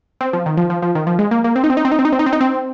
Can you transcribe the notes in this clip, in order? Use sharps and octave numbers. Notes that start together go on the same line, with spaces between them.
C4
F3
D#3
F3
F3
F3
D#3
F3
G#3
A#3
A#3
C4
D#4
C4
D#4
C4
D#4
C4
D#4
C4
D#4
C4
D#4
C4